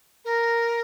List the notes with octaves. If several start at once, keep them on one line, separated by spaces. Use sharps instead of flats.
A#4